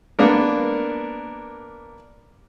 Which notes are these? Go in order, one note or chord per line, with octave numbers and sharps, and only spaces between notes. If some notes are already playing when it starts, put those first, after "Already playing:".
A#3 B3 D4 A#4